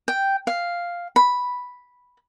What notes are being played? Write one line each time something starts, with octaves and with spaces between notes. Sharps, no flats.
G5
F5
B5